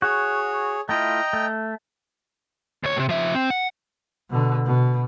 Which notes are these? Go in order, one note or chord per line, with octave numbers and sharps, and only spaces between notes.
F#4 G#4 C#5
A3 E4 F4 D#5 G5 A#5
A3
D2 C#5
A2 C3
F3 E5
C4
F#5
B2 D3
B2